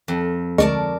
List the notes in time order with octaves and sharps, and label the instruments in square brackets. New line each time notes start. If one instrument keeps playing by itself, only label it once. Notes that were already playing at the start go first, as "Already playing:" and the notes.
[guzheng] F2
[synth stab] D2 G#3 C#6 [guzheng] A#4 D5 A5